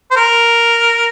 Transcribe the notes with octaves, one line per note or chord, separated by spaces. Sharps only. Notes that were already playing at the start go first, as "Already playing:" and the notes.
C5
A#4